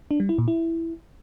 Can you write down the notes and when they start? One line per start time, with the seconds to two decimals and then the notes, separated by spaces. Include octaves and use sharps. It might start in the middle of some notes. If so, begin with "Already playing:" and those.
0.11 D4
0.20 G3
0.29 E4
0.38 A#2
0.48 E4